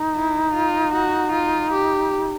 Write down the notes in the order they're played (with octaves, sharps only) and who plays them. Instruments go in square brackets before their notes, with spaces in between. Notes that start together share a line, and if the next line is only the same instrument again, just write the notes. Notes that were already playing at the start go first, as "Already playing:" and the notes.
Already playing: [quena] D#4
[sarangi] E4
F4
F#4
F4
G4